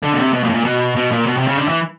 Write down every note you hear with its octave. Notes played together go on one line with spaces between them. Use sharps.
D3
B2
C3
B2
A#2
A2
A#2
B2
B2
A#2
B2
C3
C#3
D3
E3